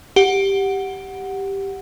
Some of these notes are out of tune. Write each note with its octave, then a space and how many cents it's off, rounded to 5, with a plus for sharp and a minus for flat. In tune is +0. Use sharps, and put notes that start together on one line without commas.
G4 +0 F#5 +0